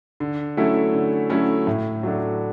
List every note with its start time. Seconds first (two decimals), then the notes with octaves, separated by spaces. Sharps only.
0.20 D3
0.57 F#3 A3 C#4 E4
0.94 D3
1.30 F#3 A3 C#4 E4
1.67 A2
2.03 F#3 A3 D4